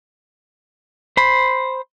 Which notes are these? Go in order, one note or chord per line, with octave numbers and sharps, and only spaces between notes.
C5 B5